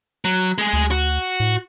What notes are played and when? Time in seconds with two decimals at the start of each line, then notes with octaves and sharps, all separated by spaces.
0.25 F#3
0.58 G#3 G#4
0.73 D2
0.91 F#4
1.40 A2